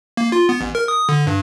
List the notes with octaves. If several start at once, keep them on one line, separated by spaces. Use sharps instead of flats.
A#3
F4
B3
A1
A#4
D#6
D3
G2